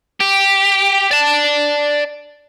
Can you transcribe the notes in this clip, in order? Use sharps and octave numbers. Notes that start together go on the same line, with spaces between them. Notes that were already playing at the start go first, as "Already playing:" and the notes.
G4
D5 A5